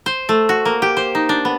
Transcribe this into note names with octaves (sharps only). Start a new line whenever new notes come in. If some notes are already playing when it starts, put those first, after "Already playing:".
C5
A3
F#4
A#3
G4
C5
D#4
D4
B3